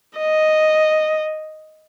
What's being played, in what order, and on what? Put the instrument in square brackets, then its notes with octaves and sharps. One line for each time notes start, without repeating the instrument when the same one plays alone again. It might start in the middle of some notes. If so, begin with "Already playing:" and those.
[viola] D#5